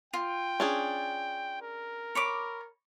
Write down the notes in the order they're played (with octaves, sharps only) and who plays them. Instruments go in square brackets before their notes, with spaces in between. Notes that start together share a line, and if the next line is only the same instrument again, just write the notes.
[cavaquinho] F4 [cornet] G5
[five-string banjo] C#4 D4 G#4
[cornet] A#4
[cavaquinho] C#5 B5 D6